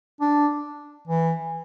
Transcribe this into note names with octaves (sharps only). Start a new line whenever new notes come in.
D4
E3